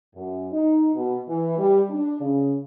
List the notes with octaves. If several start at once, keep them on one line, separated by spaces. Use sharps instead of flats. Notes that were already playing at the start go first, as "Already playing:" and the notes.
F#2
D#4
B2
E3
G3
D4
C#3